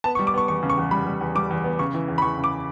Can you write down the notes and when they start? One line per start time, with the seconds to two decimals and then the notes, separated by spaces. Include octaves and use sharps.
0.04 B3 A5
0.15 C#6
0.19 G3
0.27 D6
0.34 B3 C#6
0.48 E2 C#6
0.63 C#3
0.70 C#6
0.78 E2
0.91 G3 B5
1.06 G3
1.21 E2
1.35 G3 D6
1.50 E2
1.64 B3
1.79 C#3 C#6
1.94 E3
2.08 E2
2.18 B5
2.22 E2 C#6
2.37 C#3
2.44 D6